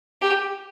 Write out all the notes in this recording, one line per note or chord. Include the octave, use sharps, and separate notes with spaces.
G4